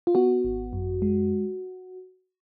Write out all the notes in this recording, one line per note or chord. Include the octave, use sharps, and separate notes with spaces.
F4
B3 F#4
G#1
F#2
G#3